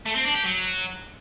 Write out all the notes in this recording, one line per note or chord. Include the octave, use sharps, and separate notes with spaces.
A3
C4
D4
G4
F#3